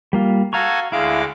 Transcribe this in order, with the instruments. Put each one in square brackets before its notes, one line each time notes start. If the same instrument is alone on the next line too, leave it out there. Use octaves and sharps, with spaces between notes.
[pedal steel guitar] G3 A#3 F4
[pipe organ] F#4 A4 G#5 [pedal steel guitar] F5 A#5 C#6
[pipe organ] D2 G#3 D6 [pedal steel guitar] E4 F5